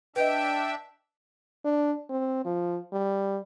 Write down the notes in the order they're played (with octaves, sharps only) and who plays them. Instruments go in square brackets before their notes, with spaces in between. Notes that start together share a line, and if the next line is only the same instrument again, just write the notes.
[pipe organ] D4 E5 [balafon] B4 D#5 [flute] G5
[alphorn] D4
C4
F3
G3